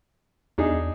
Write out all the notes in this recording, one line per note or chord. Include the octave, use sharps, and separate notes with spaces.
E2 D4 D#4 G#4